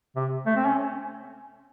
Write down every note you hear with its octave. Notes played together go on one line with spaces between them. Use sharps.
C3
A3
C4
C#4